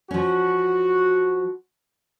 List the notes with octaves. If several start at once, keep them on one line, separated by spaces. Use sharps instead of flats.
F3 C#4 F#4